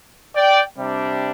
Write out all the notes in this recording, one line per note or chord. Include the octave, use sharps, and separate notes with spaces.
D5 G5
C3 G3 D4